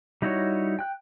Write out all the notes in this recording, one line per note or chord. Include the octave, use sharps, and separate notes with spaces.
G3 D#4 E4 F#4 C#5
G5 F#6